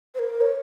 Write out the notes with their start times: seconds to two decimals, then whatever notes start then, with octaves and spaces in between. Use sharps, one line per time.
0.15 C5
0.19 A#4
0.41 C#5